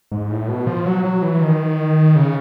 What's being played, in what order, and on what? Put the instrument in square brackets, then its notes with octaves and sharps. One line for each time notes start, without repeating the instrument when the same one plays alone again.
[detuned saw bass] G#2
A2
B2
F3
F#3
F#3
E3
D#3
C#3